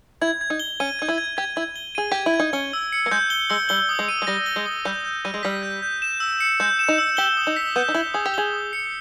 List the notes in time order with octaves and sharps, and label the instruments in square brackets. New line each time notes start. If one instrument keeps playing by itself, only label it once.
[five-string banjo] E4 [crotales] G#6
[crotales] G#6
[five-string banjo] D#4
[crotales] G7
[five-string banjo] C#4 [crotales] D#7
[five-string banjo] D#4 [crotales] G#6
[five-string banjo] E4
[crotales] G#6
[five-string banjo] G4 [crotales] G#6
[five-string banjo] E4 [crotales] G#6
[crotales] G7
[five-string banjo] G#4 [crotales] D#7
[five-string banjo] G4 [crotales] G#6
[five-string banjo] E4
[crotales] G#6
[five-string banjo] D#4
[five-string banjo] C#4 [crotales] G7
[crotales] E6
C#7
[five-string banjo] A#3
[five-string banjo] G#3 [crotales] G6
[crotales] G7
[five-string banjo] G#3 [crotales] E6
[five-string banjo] G3 [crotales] G7
[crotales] D#6
[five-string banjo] G#3
[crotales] D#7
[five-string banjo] G#3
[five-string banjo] G3 [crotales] A#6
[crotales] G7
[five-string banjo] G#3
[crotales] D#6
[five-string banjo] G3 [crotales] G6
[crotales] G6
[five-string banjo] G3 [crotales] D#7
[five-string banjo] G#3
[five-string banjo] G3 [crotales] B6
[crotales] G6
G6
E7
E6
C#7
[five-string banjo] G#3 [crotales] G6
[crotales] E7
[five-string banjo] D#4
[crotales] E6
[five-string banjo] G4 [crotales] G7
[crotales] D#6
[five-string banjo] D#4
[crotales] B6
[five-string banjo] B3 [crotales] G6
[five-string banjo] D#4
[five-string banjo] E4 [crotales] G7
[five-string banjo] G#4 [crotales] D#6
[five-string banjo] G4
[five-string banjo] G#4 [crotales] G7
[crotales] D#6
C#7